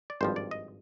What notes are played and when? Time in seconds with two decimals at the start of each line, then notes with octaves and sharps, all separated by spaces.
0.10 D5
0.21 G#1 G2 F3 C5
0.36 D5
0.51 D#5